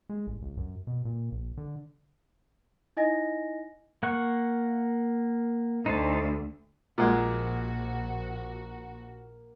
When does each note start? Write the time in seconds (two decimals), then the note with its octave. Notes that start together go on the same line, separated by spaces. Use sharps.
0.09 G#3
0.27 A1
0.42 C#2
0.57 F#2
0.87 B2
1.05 A#2
1.32 A#1
1.57 D3
2.97 D#4 E4 D#5 G#5 A#6
4.03 A#3 F#5 C#6
5.86 D2 D#4 C5 A5
6.98 A#1 A#2 G#3 A#3 F#4 F#5